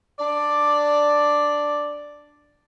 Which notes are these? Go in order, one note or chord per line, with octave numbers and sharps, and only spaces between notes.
D4 D5